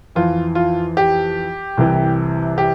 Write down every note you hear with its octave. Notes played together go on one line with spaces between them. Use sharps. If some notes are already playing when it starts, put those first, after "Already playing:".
F2 E3 F4
F4
G4
C2 C3 E3
G4